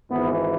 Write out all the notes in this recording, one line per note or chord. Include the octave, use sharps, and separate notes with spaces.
G#1 G#2 E3 B3